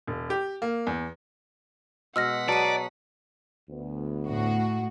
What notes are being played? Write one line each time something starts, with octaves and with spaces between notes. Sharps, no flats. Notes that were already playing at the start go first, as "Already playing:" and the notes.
E1
G4
A#3
E2
B2 G#3 F#5 E6 F6 A#6 B6
F#3 B3 G#4 D5 A5 D#7
D2 B3
A2 F#4